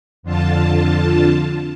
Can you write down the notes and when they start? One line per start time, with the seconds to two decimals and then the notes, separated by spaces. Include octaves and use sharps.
0.23 F2 D3 F4 A5